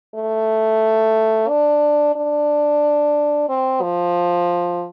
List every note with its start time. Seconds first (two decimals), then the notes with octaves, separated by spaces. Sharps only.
0.15 A3
1.49 D4
2.16 D4
3.49 C4
3.82 F3